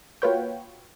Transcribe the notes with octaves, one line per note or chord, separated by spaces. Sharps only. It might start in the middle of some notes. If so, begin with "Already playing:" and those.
A#3 F4 F#4 B4 C#5 G5